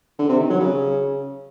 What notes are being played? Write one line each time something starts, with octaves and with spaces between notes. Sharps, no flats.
D3
C3
D#3
F#3
C#3